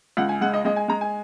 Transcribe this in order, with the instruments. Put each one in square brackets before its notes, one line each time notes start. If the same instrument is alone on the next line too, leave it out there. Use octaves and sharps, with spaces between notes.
[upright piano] C#2 F#5
G#5
G#3 F#5
D#5
G#3 D#5
G#5
G#3 A#5
G#5